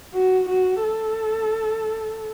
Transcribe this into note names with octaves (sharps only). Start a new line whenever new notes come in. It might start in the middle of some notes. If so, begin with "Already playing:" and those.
F#4
F#4
A4